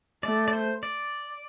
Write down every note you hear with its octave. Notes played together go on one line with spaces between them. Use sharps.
A3 D5
D5
C5
D5